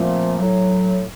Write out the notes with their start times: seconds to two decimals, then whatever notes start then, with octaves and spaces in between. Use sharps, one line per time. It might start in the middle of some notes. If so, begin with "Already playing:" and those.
Already playing: A#2 F3 A3 C4
0.37 A2 F#3 A3